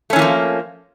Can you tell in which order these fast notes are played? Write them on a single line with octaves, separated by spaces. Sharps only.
A3 C#4 E3 A#3 F3